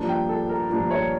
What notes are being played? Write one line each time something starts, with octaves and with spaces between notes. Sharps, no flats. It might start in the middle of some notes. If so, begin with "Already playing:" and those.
Already playing: G2 F3 A#3 D4
G5
A4
A#4
G2 F3 A#3 D4
C#5